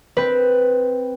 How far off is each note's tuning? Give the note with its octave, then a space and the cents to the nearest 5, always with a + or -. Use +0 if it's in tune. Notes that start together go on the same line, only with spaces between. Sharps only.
C4 +0 B4 +0